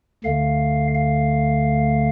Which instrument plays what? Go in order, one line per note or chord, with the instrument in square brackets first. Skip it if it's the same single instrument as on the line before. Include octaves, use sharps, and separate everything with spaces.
[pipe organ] D2 D3 A3 F5
F5